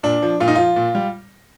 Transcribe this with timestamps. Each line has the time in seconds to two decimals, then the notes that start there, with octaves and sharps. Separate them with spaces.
0.03 A#2 D4
0.22 F3
0.40 A#2 F4
0.48 D#4
0.55 F3 F4
0.76 A#2
0.95 G3